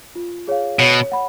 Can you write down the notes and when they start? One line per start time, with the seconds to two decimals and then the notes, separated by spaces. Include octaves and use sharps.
0.15 F4
0.48 G#4 C#5 F5
0.79 B2 C#5
1.12 F#5 B5